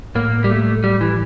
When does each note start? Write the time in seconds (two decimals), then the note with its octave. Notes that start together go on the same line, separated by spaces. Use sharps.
0.15 A2 A#3
0.44 G3
0.50 A3
0.84 G3
1.01 E3